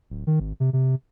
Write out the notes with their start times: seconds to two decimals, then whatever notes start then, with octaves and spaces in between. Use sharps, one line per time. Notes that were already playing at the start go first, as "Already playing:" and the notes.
0.10 D1
0.27 D#3
0.40 G#1
0.60 C3
0.73 C3